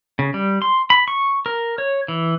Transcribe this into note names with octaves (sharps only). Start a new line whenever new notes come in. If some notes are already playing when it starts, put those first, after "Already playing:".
C#3
G3
C6
B5
C#6
A#4
C#5
E3